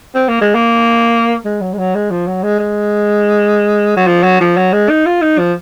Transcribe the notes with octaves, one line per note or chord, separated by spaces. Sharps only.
C4
A#3
G#3
A#3
G#3
F#3
G#3
F#3
G#3
F3
F#3
G#3
G#3
F#3
F3
F#3
F3
F#3
G#3
D#4
F4
D#4
F3